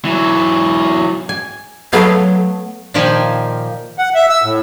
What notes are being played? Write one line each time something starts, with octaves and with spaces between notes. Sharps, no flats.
E3 F#3
G#5
F#3 A3 B3 F5
A#2 D#3 F3 G4 G5 G#5
F#5
E5
E6
A2